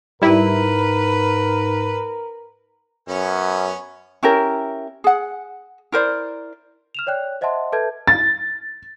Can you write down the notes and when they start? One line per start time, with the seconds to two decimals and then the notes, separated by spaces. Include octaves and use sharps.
0.22 G#2 G3 E4 A#4 B4
3.09 F#2 B3 C#4 C#5
4.23 C#4 E4 G4 A#4
5.04 G#4 F#5
5.92 E4 A#4 C5 D5
6.95 F6 E7 F7
7.07 C#5 D5 G5 F#6
7.41 C5 D#5 E5 F#5 A5 C6
7.72 A4 B4 E5 A5 G6 G#6
8.08 A6